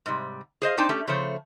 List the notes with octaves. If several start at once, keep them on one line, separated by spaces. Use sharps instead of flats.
G#2 C3 G3
G#4 C5 D#5 F5
C4 D4 D#4 C5 G5 A5
A3 C#4 G4
C#3 F3 A3 C5 C#5